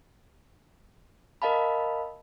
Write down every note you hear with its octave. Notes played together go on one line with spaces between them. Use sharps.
A#4 D#5 F5 A5 B5